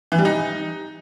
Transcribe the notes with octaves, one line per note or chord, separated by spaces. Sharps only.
E3
G3
D#4